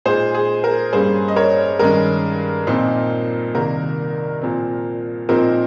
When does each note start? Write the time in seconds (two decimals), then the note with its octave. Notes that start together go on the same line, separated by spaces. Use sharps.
0.05 A#2 G#3 D#4 G#4 C5
0.34 G#4
0.64 A#4
0.93 G2 G3 A#3 C#4 G#4 C5
1.28 D#5
1.36 A#4 C#5
1.79 G2 D#3 G#3 C#4 A#4
2.67 A#2 F3 C4 D#4
3.54 C2 C3 D#3 A#3 A#4
4.42 A#2 F3 C4
5.29 A#2 F3 C4 D#4 A#4